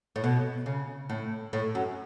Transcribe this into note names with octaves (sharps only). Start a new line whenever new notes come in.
A2
B2
C#3
A2
A2
F#2